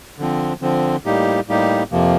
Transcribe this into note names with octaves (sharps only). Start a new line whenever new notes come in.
D3 F3 C4
D3 F3 C4
A2 G3 A#3 D#4 G4
A2 G3 A#3 D#4 G4
F2 C3 F3 A#3